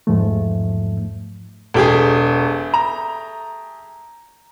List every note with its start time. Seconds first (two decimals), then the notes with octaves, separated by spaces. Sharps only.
0.07 E2 G#2 F3 A3
1.74 E1 A3 G4 G#4
2.74 A#5